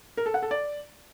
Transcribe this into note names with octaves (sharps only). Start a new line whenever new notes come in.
A#4
A4
F#5
A4
D5